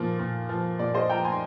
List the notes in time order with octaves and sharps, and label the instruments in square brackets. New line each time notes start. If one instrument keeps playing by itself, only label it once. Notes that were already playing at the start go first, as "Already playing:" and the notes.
Already playing: [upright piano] A#2 F3
A#2
F3
A#2 D5
C5 D#5
F3 G5 A#5
G#5 C6